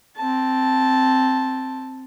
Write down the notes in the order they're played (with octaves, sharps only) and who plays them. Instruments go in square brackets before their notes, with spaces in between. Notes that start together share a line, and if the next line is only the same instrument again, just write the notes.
[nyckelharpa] C4 A5